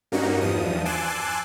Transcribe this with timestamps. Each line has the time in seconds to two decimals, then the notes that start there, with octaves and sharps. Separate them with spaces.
0.12 G2 A#3 C#4 D#4 F#4
0.41 E2 G2 F3 D#6
0.85 G#5 A5 C6 D6 E6 F#6